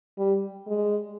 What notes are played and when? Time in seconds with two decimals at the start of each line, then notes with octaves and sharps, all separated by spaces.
0.18 G3
0.67 G#3